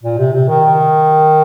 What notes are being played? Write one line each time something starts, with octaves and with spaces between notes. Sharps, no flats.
A#2
C3
C3
D#3